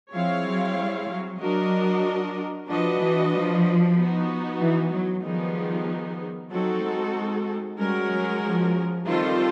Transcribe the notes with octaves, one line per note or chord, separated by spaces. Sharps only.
F3 C4 E4 G#4 C#5 F5
F#3
G3
F#3
F#3 D4 F#4 A#4 D#5
F3 D4 F#4 B4 D#5
E3
F3
B3 D#4 F#4
E3
F#3
D#3 F3 G3 B3 D#4 G#4
F#3 C4 D#4 F#4 A4
G#3
G#3
G3 G#3 C#4 F#4 A#4
F#3
F3
D#3 G3 C4 F4 A4 C5